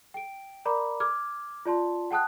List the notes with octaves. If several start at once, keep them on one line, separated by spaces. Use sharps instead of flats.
G5 D7
A#4 D5 A#5 B5 D6
D6 F6 G#6
F4 D5 A5 C6
F#5 G5 A5 D#6 F#6